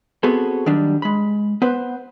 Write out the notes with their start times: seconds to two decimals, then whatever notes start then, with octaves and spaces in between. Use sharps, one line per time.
0.23 B3 C4 F#4 G#4 A4
0.66 D#3 F#3 G3 D4
1.02 G#3 B5
1.62 B3 B4 C5